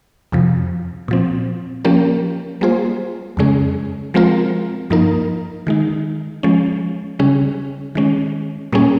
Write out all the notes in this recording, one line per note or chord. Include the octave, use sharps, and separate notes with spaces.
F2 C3 F3
A#2 F3 C4
F3 A#3 C#4 G4 A#4
G3 A#3 F4 G#4 C5
F2 C#3 G#3 C#4 G#4
F3 G#3 C4 F4 A#4
G2 F3 A#3 D#4 A#4
D#3 G#3 D#4
F3 G#3 C#4
C#3 G3 C#4 G#4
D#3 G#3 C#4
A#2 G3 A#3 C#4 G#4